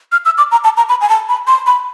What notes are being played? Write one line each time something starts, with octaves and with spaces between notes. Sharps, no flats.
F6
E6
D6
A#5
A5
A#5
B5
G#5
A5
B5
C6
B5